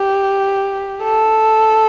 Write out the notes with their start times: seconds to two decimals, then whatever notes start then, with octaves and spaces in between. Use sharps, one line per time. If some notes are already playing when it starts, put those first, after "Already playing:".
Already playing: G4
1.03 A4